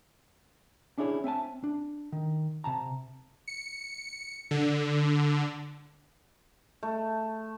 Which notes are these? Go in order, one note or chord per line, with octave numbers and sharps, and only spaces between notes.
C#4 D4 E4 G#4 C#5
C4 E5 G#5 A5
D4
D#3
C3 A5 A#5
C#7
D3
A3